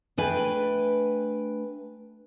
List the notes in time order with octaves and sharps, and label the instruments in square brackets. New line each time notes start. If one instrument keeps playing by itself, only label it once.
[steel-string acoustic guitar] A3 D4 B4 G5 G#5